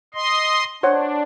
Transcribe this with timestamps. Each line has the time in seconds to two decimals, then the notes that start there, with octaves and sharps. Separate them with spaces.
0.15 D#5 C6
0.83 D4 C5 C#5 F#5